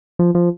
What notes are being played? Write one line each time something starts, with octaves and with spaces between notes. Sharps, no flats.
F3
F3